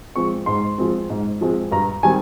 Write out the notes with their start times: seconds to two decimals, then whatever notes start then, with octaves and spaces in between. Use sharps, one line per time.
0.16 F3 G#3 C4 C#6
0.46 G#2 C6
0.78 F3 G#3 C4
1.10 G#2
1.41 F3 G#3 C4
1.72 G2 A#5
2.03 D#3 G3 C4 G#5